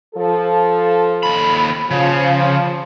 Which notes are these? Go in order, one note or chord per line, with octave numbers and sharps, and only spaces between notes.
F3 A4
D#2 B5
C#3 F3